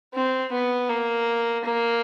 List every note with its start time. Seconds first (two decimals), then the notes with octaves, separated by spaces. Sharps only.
0.14 C4
0.52 B3
0.89 A#3
1.64 A#3